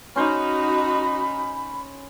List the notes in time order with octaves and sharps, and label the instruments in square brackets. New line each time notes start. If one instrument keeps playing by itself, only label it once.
[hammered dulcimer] C#4 C5 [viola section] D#4 F#4 [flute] B5